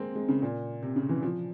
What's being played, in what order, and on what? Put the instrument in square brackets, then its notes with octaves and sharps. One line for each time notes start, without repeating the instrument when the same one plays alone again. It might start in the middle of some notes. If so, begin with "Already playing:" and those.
Already playing: [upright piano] G#3 A#3 C4
G#3
C#3
A#2
C3
C#3
E3
F3